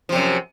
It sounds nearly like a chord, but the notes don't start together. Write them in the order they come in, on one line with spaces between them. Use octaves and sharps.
F3 C3 F#2